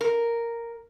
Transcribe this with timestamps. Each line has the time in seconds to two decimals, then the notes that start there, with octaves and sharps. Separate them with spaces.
0.01 A#4